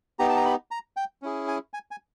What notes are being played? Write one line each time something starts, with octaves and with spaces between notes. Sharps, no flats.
B3 D#4 G4 A#5
A5
A#5
B5
A#5
G5
C#4 E4 G#4
G#5
G#5
G#5